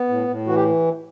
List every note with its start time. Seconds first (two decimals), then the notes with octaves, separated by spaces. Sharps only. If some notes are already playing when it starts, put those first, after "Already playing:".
Already playing: B3
0.09 A2
0.28 A2
0.47 E3 F#4
0.55 G4